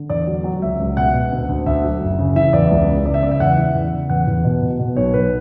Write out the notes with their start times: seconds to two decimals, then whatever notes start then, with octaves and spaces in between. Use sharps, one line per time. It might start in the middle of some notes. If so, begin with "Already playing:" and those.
Already playing: D3
0.10 E2 D5
0.27 F#3
0.44 F#3
0.62 C#2 E5
0.80 C#2
0.97 B2 F#5
1.14 B2
1.31 D2
1.49 D2
1.66 D2 E5
1.84 F#3
2.01 F#1
2.18 C#3
2.35 E3 E5
2.53 E2 D5
2.70 C#2
2.88 C#3
3.06 C#3 D5
3.14 E5
3.23 C#3 D5
3.31 E5
3.40 E2 F#5
3.57 E3
3.75 E2
3.93 C#3
4.10 E2 F#5
4.27 E2
4.45 B2
4.62 B2
4.79 B2
4.96 B1 C#5
5.14 B1 B4